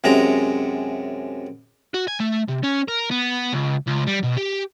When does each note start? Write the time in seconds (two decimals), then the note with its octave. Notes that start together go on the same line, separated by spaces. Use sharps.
0.04 F#2 C3 G#3 A#5
1.94 F#4
2.08 G#5
2.20 A3
2.49 C3
2.64 C#4
2.88 A#4
3.11 B3
3.53 C#2
3.87 C#2
4.07 G3
4.24 B2
4.37 G4